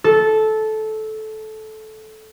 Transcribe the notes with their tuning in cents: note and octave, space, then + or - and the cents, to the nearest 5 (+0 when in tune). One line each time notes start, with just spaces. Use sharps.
A4 -15